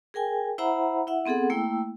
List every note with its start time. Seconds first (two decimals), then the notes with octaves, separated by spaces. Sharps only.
0.14 G#4 A#4 G5 G#5
0.58 E4 C5 E5 F#5 A#5 B5
1.07 E4 E5 F#5
1.26 B3 C4 G#4 A4 F#5
1.50 A3 A#3 E4 G5 E6